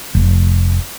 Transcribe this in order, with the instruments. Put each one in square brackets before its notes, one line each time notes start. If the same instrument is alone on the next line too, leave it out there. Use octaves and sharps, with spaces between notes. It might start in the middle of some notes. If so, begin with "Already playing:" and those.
[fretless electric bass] F1